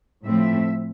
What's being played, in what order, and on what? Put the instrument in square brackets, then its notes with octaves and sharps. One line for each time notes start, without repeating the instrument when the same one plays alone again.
[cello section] A2 F3 A3 C4 E5